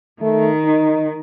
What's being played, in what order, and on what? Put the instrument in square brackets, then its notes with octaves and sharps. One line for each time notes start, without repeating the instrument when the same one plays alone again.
[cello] D#3 [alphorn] A3
[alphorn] D#4